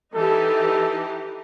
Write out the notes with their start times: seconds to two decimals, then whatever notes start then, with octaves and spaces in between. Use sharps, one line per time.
0.15 E3 D#4 G4 A4